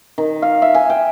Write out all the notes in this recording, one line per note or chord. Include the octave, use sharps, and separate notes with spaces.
D#3
F5
E5
G#5
G5